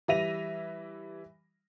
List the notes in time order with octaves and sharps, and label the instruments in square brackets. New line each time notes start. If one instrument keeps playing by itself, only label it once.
[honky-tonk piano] E3 G3 E5 A#6 D#7 F7